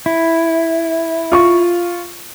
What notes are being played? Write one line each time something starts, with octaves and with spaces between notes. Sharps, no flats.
E4
F4 C#6